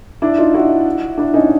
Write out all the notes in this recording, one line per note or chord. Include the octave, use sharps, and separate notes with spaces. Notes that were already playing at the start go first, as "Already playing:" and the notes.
D4 E4
D#4 F4
E4 F#4
D4 E4
C#4 D#4